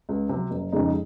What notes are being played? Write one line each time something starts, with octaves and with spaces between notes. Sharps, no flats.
C#2
C3 F#3
F#1
F2 C#3 G#3 D#4